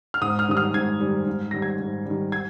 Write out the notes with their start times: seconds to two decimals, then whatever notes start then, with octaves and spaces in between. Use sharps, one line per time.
0.14 F6
0.21 G#2 D#6
0.39 F6
0.48 D#3 G3 D#6
0.57 F6
0.74 G#2 G#6
1.00 D#3 G3
1.26 G#2
1.51 D#3 G3 A#6
1.62 G#6
1.80 G#2
2.05 D#3 G3
2.32 G#6